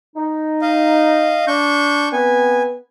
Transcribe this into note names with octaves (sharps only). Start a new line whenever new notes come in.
D#4
D#5 F5
D4 C#6 G6
B3 C4 B4 G#5